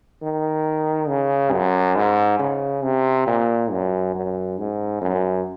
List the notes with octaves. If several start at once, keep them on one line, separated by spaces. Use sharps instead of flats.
D#3
C#3
F#2
G#2
C#3
C3
A#2
F#2
F#2
G#2
F#2